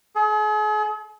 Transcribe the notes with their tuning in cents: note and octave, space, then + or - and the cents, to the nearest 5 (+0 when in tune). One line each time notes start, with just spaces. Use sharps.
G#4 +40